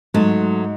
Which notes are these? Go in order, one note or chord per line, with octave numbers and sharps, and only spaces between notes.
G#2 F#3 A3